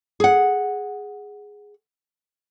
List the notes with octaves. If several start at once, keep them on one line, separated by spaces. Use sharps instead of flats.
G#4 F#5